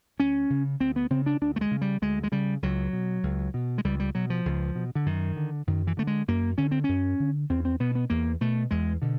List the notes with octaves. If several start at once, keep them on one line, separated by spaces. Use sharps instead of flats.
D2 C#4
C#3
D2 C4
B3
C#3 C4
D4
D2 D4
A3
G#3
C#3
G3
D2 G#3
G#3
C#3 G3
C#2 F#3
B2
C#2
B2
G#3
C#2 G3
G3
B2 F#3
F3
C#2
B2
D3
F#2 D#3
D3
F#2 D#3
E3
D3 A3
G#3
F#2 A#3
D3 C#4
C4
F#2 C#4
D3
E2 C4
C4
B2 B3
B3
E2 A#3
B2 A3
E2 G#3
B2 D3